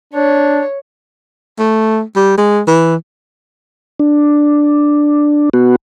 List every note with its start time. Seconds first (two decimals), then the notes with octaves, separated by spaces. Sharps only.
0.13 D4 C#5
1.59 A3
2.16 G3
2.38 G#3
2.68 E3
4.00 D4
5.54 B3 F#4